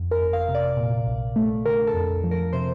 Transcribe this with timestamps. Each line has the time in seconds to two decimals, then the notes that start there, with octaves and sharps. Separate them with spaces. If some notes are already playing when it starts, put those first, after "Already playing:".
Already playing: F2
0.11 A#4
0.19 G1
0.33 F5
0.48 C3
0.55 D5
0.77 A#2
1.06 A#1
1.36 A3
1.65 D3 A#4
1.87 A4
1.94 F2
2.24 F3
2.31 A#4
2.53 C3 C5